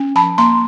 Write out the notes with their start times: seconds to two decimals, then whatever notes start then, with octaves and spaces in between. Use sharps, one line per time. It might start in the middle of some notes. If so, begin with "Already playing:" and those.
Already playing: C#4
0.15 F3 A5 B5
0.38 A#3 A#5 C6